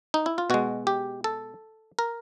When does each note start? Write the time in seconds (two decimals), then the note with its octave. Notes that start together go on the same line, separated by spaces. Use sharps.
0.14 D#4
0.26 E4
0.38 F4
0.50 B2 G#3 F#4
0.87 G4
1.24 A4
1.99 A#4